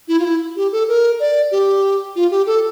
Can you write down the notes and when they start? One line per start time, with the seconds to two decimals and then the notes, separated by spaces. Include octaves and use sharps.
0.08 E4
0.19 F4
0.25 E4
0.57 G4
0.72 A4
0.88 A#4
1.20 D5
1.51 G4
2.16 F4
2.31 G4
2.47 A4